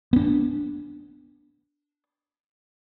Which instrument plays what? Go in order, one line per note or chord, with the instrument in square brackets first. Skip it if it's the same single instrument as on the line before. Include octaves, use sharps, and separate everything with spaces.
[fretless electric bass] B3 D4